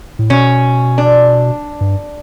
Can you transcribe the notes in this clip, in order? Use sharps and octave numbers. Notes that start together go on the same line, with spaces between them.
A2
B2 C#4
D4
G2